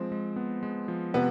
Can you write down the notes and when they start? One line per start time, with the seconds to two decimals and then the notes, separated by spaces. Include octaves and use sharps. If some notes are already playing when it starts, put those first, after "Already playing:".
Already playing: F3 G#3 C4
0.12 G#3
0.36 B3
0.63 G#3
0.88 F3
1.14 C3 B3